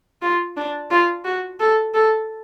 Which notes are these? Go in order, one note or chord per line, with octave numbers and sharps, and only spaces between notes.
F4
D4
F4
F#4
A4
A4